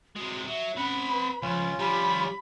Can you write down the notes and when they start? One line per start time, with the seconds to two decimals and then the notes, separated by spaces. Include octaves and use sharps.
0.16 C3 G#3 F#4
0.47 F#3 E5
0.77 C4 C#4 F#5 B5
1.12 B4
1.42 C#2 F3 C#4 F4
1.79 F3 G3 G4 B5